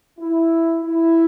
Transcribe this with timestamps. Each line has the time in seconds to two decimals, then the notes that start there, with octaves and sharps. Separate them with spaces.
0.20 E4
0.85 E4